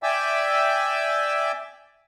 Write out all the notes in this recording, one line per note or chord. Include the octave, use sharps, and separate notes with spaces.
D5 E5 G5 G#5 D6 E6